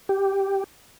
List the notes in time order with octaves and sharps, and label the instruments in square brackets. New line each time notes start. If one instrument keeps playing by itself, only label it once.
[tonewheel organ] G4